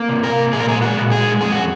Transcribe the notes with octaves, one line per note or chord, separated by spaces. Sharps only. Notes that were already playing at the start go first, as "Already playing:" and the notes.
Already playing: A#3
C3
A#4
A#3
A#2 G#4
A#4
G#4
G#3
F#4
A#2
G#4
G#3
F2 G#4
F#4